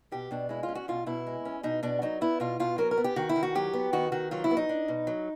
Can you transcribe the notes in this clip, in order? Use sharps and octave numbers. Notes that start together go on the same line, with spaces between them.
B2 G4
B2 D4
G#3 E4
F4
C#4
F#4
B2 F4
B2 E4
G#3
C#4
B2 D#4
B2 D4
F#3 D#4
B3 E4
B2 F4
B2 F4
F#3 A#4
A#4
B3
G4
D#3 F#4
E4
D#3
F#4
F#3 G4
B3
D#3 F#4
D#3 F#4
F#3 F4
E4
B3
D#4
D4
B2
F#3